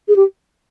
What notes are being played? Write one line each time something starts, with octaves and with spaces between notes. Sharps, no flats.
G#4
G4